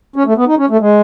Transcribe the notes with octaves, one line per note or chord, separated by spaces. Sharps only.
C#4
A3
B3
D#4
C#4
A3
G#3